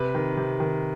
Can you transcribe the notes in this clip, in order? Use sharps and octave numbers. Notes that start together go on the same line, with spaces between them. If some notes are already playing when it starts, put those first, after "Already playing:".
Already playing: C3 B4
D#3
C3
D#3